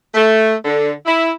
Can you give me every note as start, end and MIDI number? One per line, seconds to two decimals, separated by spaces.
0.14 0.54 57
0.65 0.92 50
1.05 1.30 64